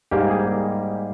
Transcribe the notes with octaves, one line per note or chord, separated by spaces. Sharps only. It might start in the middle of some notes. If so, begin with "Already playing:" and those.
G#2 G3 A#3 G4
G#4